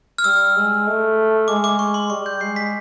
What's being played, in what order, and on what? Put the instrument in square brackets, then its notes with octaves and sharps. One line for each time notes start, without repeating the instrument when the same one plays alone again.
[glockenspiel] F6
[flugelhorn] G3 [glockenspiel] E6
[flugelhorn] G#3
A3
[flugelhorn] G#3 [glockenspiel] D6
[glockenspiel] D6
C#6
C6
[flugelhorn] G3 [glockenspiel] C#6
[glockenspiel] G6
[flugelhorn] G#3 [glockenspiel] C7
[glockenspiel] B6